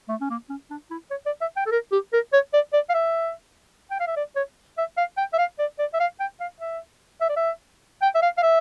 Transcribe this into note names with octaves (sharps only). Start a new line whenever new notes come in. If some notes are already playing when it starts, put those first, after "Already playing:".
A3
C#4
A#3
C#4
D4
E4
C#5
D5
E5
G5
A4
A#4
G4
A#4
C#5
D5
D5
F5
E5
G5
F5
E5
D5
C#5
E5
F5
G5
E5
F5
D5
D5
E5
F5
G5
F5
E5
E5
D5
E5
G5
E5
F5
F5
E5